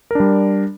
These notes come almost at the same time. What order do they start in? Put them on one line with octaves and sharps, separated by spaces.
A#4 D4 G3